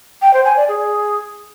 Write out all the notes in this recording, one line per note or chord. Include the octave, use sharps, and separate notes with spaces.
G5
C5
G#5
D5
G#4